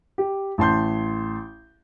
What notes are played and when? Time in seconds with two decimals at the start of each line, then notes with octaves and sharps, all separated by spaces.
0.18 G4
0.58 A1 A5 C6 G6